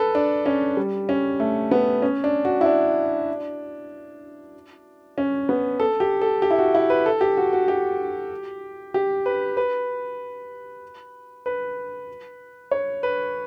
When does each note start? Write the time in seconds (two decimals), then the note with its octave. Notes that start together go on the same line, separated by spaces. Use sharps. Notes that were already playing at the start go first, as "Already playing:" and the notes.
Already playing: A4 B4
0.15 D4
0.46 C#4
0.77 G3
1.09 C#4
1.40 A3
1.71 B3
2.02 C#4
2.24 D4
2.45 F#4
2.61 E4
2.66 D4
5.18 C#4
5.49 B3
5.80 A4
6.00 G4
6.22 A4
6.42 G4
6.51 E4
6.59 F#4
6.75 E4
6.90 B4
7.06 A4
7.21 G4
7.37 F#4
7.53 F#4
7.68 G4
8.94 G4
9.26 B4
9.57 B4
11.46 B4
12.71 C#5
13.03 B4